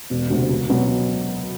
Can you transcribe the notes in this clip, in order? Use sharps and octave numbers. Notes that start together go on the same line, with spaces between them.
E1
D2 C3
C#2
B2 F#3